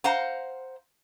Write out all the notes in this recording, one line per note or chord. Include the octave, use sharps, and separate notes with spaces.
C5 F5 F#5 A#5